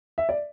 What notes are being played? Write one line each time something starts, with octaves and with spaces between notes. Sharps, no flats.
E5
D5